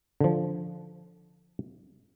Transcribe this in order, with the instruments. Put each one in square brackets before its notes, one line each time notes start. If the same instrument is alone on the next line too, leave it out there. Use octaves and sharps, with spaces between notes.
[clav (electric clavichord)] D3 F3